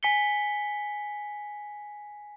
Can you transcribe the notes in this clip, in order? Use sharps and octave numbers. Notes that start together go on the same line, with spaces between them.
G#5 B6 C#7 G7